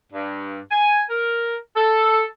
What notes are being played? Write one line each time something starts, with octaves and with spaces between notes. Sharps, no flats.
G2
G#5
A#4
A4